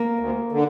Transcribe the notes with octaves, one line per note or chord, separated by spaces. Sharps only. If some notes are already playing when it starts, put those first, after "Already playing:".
Already playing: A#3
D2
D3